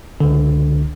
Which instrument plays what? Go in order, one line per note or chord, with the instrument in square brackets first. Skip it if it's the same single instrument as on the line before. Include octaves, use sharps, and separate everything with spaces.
[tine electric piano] C#2 D3